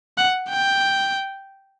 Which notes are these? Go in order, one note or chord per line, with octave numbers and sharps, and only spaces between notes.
F#5
G5